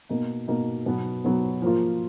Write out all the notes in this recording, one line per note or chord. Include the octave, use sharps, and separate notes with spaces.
B2 A#3 D#4
B2 A#3 D#4
B2 F#3 B3
B2 F#3 B3
F3 A#3 F4